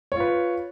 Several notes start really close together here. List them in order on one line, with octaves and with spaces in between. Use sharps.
C#5 F4 B4